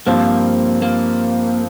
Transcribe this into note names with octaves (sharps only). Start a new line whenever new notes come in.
G2 F3 A#3 C4
A#3